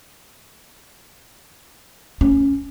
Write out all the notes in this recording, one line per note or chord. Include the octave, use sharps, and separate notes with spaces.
C#4